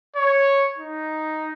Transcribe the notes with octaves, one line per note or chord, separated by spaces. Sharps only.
C#5
D#4